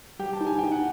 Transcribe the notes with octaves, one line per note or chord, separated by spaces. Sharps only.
G3 G4 G5
A5
D#4
G#5
D#4 G5
F#5